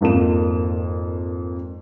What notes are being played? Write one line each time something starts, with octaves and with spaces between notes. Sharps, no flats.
G#1 F2 A#3 E7